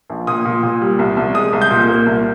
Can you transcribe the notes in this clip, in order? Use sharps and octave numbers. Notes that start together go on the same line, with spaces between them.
A#1
A#2 D#6
A#2
A#2
G3
C2
C2
G#3 D#6
C2
G6
A#2
A#3
C2